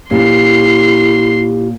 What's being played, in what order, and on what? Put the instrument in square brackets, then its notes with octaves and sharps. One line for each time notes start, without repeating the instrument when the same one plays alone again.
[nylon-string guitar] A#2 C#4 [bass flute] E4 [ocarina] G4 [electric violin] C6 C7